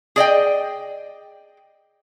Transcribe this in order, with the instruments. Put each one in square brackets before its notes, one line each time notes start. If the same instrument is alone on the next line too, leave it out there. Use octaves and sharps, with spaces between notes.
[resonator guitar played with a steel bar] G#4 D5 D#5 G5